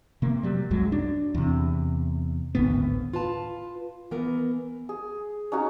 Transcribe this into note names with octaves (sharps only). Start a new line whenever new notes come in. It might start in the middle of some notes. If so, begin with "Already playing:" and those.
C3 A#3
F#3 G3
C2 F#2 F#3 G#3
D4
E2 C3
G#1 D2 A2 B3
F4 B4 A5
E3 B3 A#4
G#4
C#4 D#4 F#4 A#5